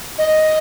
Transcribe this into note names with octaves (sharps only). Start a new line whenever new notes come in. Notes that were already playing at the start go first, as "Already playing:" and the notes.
D#5